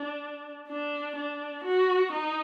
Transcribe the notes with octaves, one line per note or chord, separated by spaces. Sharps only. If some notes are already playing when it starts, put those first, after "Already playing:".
Already playing: D4
D4
D4
F#4
D#4